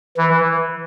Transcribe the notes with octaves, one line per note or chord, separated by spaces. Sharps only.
E3